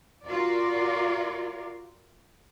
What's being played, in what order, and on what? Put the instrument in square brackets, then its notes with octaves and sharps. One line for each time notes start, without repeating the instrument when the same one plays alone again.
[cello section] F4 F#4 A#4 D5